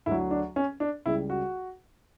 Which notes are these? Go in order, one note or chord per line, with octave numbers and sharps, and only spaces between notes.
D2 D3 F#3 E4
D4
C#4
D4
C#2 C#3 G3 E4
F#4